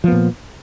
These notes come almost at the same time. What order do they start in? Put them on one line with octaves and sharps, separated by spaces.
F3 B3 A#2